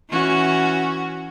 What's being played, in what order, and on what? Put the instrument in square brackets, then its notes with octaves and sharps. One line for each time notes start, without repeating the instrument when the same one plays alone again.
[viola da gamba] E3 C#4 F#4